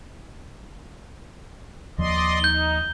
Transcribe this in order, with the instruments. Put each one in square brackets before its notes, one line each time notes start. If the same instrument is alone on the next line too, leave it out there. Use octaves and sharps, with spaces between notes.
[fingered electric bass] D#2 F3 [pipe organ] D5 D#5 C6
[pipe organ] D#4 [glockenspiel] G6 G7